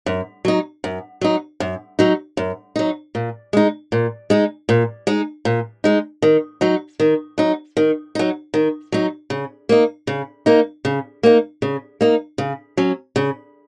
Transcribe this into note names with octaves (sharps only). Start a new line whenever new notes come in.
F#2
F#3 D#4
F#2
F#3 D#4
F#2
F#3 D#4
F#2
F#3 D#4
A#2
G#3 D#4
A#2
G#3 D#4
A#2
G#3 D#4
A#2
G#3 D#4
D#3
F#3 D#4
D#3
F#3 D#4
D#3
F#3 D#4
D#3
F#3 D#4
C#3
A#3 D#4
C#3
A#3 D#4
C#3
A#3 D#4
C#3
A#3 D#4
C#3
F#3 C#4
C#3